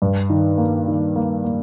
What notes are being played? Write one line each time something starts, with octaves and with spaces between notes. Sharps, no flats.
G2
D#3
A#3
D#3
A#3
A#3